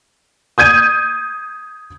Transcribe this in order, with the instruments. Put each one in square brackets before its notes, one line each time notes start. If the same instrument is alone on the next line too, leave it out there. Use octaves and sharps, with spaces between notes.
[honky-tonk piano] D#6 G6 G#6 D#7